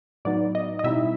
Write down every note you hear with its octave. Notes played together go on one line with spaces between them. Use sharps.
A2 F#3 B3 D#4 D5
D#5
D#5
B2 G3 C4 D#4 E4 E5